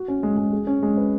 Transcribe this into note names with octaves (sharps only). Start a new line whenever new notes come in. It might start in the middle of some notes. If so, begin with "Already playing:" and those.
Already playing: F#4
C#4
G#3
G#3
G#4
C#4
G#3
B4